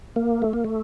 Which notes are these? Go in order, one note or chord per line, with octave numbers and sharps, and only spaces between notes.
A#3
A3
A#3
A3